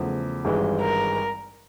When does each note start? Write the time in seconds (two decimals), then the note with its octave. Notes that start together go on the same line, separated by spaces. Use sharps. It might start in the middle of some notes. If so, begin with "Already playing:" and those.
Already playing: E2 C#3 F3 A3
0.45 G#1 G2 E3 G#3
0.81 A#4